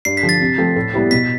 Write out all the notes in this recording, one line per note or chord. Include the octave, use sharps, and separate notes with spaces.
G2 C7
B6
D3 F3
A6
C3
F3 A3 C4
A2
G3 B3 E4 G4
B2 B6